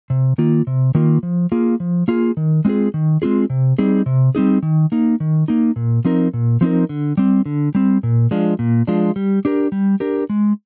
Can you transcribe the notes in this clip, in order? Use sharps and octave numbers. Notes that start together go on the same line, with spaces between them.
C3
D#3 A#3 F4
C3
D#3 A#3 F4
F3
A#3 F4 G#4
F3
A#3 F4 G#4
D#3
G#3 C4 F4 G#4
D#3
G#3 C4 F4 G#4
C3
G3 C4 D#4 G#4
C3
G3 C4 D#4 G#4
D#3
A#3 D#4
D#3
A#3 D#4
A#2
F3 C4 D#4 A#4
A#2
F3 C4 D#4 A#4
D3
G3 C4
D3
G3 C4
A#2
F3 G#3 D4 F4
A#2
F3 G#3 D4 F4
G3
D4 G4 A#4
G3
D4 G4 A#4
G#3